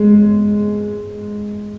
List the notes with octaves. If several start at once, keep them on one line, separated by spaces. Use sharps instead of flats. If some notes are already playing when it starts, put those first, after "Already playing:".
Already playing: G#3